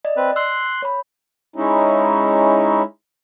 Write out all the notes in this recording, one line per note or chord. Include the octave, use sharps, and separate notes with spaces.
D5 D#5
C4 B4
C6 E6 F#6
C#5 B5
G#3 C#4 D#4 E4